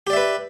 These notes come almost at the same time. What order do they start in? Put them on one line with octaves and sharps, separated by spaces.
G4 D5 E5 B4